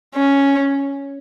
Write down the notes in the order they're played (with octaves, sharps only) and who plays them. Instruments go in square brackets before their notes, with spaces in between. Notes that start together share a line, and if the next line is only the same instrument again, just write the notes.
[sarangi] C#4